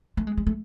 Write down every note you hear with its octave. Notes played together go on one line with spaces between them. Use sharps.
A3
G#3
G#3
A3